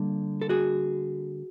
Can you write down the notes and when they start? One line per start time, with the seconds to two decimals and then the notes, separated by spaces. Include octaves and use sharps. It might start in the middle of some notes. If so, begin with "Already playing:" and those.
Already playing: D3 G3 A#3
0.41 A4
0.49 F#4 G#4